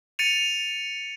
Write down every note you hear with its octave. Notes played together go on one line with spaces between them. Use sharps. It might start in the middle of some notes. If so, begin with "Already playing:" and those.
A6 C#7 D#7 F7